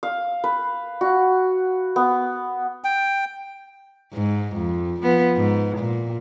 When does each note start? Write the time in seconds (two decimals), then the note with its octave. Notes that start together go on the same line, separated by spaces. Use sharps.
0.03 F5
0.44 B4
1.01 F#4
1.96 B3
2.84 G5
4.13 G#2
4.56 F2
5.02 F3 B3
5.36 G#2
5.78 A#2